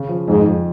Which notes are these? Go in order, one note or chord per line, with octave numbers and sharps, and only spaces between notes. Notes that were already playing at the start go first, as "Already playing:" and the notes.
Already playing: C#3
F3
F2 G#2
F2